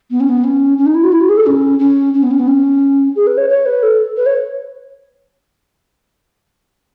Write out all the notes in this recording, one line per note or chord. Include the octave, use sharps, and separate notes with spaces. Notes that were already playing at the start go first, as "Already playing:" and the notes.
B3
C#4
B3
C#4
C#4
D#4
E4
F#4
E4
F#4
G#4
A4
C#4
C#4
C#4
B3
C#4
B3
C#4
G#4
B4
C#5
C#5
B4
A4
B4
C#5